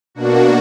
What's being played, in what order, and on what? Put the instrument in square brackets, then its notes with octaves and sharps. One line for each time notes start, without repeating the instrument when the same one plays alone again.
[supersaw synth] B2 A#3 D4 F#4